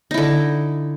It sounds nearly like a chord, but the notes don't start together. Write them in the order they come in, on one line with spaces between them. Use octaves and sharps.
D#4 E4 D3